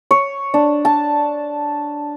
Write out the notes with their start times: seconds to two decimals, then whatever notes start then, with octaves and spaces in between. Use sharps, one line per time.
0.11 C#5
0.54 D4
0.85 A5